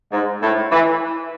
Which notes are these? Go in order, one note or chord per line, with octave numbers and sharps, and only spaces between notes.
G#2
A2
E3